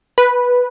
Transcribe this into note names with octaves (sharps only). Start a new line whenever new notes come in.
B4